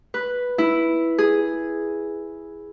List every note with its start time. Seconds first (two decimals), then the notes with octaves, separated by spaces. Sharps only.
0.14 B4
0.58 E4
1.18 G#4